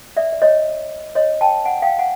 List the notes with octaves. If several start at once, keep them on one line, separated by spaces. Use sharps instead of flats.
D5 E5
D5
C#5 D#5
C#5 D#5
G5 A5
F#5 G#5
F5 G5
F#5 G#5